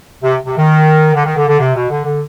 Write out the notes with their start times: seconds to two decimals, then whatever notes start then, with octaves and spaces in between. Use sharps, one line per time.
0.24 C3
0.46 C3
0.58 D#3
1.15 D3
1.25 D#3
1.37 D3
1.48 D3
1.60 C3
1.76 B2
1.90 D3
2.06 D3